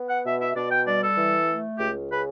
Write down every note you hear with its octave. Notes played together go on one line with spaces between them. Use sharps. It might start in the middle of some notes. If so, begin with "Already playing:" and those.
Already playing: B3
F#5
B2 E5
E5
B2 D5
G5
G3 D5
A4
E3
A3
C#2 G4
C#3 B4